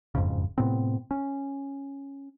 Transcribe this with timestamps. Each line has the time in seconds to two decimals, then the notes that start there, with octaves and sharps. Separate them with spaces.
0.15 F#1 F2 G#2 C#3
0.58 A2 C3 B3 C4
1.11 C#4